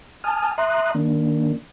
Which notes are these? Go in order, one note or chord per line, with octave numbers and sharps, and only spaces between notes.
G#5 A5 D#6 F6
E5 A#5 C6 D#6 F#6
D#3 A#3 D4